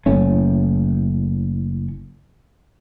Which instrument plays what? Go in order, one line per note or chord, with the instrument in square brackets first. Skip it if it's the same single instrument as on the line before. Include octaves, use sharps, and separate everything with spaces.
[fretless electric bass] F#1 A2 C#4